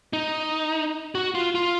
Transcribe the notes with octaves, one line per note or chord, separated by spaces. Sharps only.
D#4
F#4
F4
F4